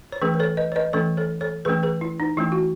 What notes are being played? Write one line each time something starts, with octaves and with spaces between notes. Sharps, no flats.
C#5
E3 A3 C#4 G#4 B4
B4
A4 C#5
B4 D#5
C#5
B4 D#5
E3 A3 C#4 A4 C#5
A4 C#5
A4 C#5
E3 A3 C#4 G#4 B4
G#4 B4
E4
D#4
E3 A3 C#4 E4
F#4